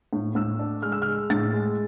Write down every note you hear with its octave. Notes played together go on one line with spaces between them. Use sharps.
A2
A2 E6
D4
G#3 F6
E6
F6
G#3
A2 A6
G#3